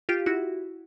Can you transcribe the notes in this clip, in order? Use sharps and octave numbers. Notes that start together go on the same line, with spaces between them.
F4 G4
E4 F#4